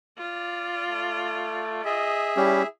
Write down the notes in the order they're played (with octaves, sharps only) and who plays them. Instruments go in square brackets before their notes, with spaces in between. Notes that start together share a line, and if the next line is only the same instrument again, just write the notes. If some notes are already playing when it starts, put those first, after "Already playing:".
[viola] F4 D5
[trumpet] A3
[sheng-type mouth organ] G#4 E5 [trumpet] D#5
[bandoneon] G3 C#4 G4 [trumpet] E4